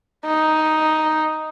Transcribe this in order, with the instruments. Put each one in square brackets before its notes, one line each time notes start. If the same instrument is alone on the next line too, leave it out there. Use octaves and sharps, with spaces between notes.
[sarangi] D#4